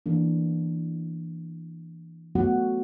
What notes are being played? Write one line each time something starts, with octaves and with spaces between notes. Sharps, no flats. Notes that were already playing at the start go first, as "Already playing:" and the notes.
E3 A#3 D4
F#3 A3 B3 F4 F#4 F#5